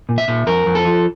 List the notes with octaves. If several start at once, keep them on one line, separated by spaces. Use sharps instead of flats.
A#2
E5
A#2
F2 A#4
F2
A4
F3